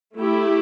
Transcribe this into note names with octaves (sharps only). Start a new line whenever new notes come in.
A3 E4 G4